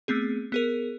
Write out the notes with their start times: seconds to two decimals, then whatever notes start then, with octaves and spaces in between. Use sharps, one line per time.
0.08 A3 B3 C4 G#4
0.52 B3 G#4 A#4